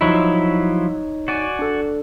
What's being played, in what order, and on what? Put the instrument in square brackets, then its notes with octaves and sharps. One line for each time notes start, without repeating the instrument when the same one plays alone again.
[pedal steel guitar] F3 F#3 E4 [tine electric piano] D#4 C#5
[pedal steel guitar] F#4 D5 G#5
[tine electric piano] D4 A4